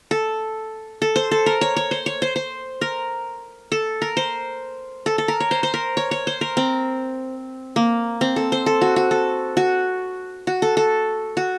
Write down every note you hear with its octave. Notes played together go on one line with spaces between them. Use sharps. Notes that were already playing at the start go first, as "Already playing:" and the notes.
A4
A4
C5
A4
A#4
C#5
C#5
C5
C#5
C5
C5
A#4
A4
A#4
C5
A4
A4
A#4
C#5
C5
C5
A#4
C#5
C#5
C5
A#4
C4
A#3
C4
A4
C5
A4
F#4
F#4
A4
F#4
F#4
A4
A4
F#4